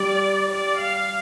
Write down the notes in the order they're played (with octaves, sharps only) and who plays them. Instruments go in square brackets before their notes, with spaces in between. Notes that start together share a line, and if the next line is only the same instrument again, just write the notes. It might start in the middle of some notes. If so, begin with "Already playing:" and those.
Already playing: [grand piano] G3 [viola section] D5
[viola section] D5
F5